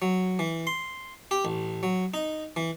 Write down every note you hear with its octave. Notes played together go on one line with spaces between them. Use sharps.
F#3
E3
C6
G4
A1
F#3
D#4
E3